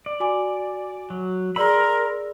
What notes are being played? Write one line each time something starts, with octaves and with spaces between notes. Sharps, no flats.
D5
F#4 G#5 D6
F#3
G#4 A#4 D5 B5 C6 E6